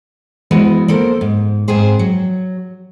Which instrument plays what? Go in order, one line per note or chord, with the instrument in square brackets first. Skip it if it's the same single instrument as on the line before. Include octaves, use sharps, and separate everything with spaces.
[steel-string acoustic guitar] E3 G#3 B3 F#4 C5
A#3 A4 A#4 C5
G#2
G#2 B3 C4 G#4 C5
F#3